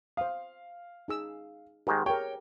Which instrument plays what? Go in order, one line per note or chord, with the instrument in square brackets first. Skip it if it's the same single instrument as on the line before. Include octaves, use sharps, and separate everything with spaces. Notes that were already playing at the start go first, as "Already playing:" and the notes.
[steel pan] C5 D#6 [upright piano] F5
[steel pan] D#4 G#4 E6
[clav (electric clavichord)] G#2 D#3 G#3 [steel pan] G4 A#4
[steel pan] G4 G#4 A#4 [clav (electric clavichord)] C#5 [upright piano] G5